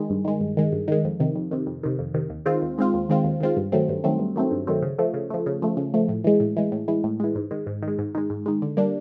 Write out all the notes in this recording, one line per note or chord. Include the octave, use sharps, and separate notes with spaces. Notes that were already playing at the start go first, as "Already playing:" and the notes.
Already playing: D#3 G#3
G2
D#3 G#3
G2
D#3 G#3
G2
D#3 G#3
F2
C3 D#3
F2
C3 D#3
F2
C3 D#3
F2
C3 D#3
D#2
D#3 G#3 C4 F4
D#2
D#3 G#3 C4 F4
D#2
D#3 G#3 C4 F4
D#2
D#3 G#3 C4 F4
G2
D#3 F#3 A3 C4
G2
D#3 F#3 A3 C4
G2
D#3 F#3 A3 C4
G2
D#3 F#3 A3 C4
C#3
F3 A3
C#3
F3 A3
C#3
F3 A3
C#3
F3 A3
A2
E3 G#3
A2
E3 G#3
A2
E3 G#3
A2
E3 G#3
G#2
D#3 G#3
G#2
D#3
G#3
G#2
D#3 G#3
G#2
D#3 G#3
D3
G3 A#3 D4